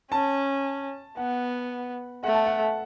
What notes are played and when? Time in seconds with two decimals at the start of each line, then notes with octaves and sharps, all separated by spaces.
0.11 C#4 A5
1.17 B3 F#5
2.24 A3 F#5
2.34 A5
2.46 F#5